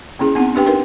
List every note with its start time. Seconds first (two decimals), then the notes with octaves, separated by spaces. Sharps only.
0.19 A#3 C#4 E4 G#4
0.35 B3 C4 D#4 F#5
0.55 D4 G4 B4 G5
0.66 D#4 A#4 B4